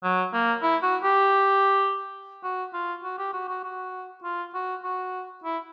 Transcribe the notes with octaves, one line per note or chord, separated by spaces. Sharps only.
F#3
A#3
E4
F#4
G4
F#4
F4
F#4
G4
F#4
F#4
F#4
F4
F#4
F#4
E4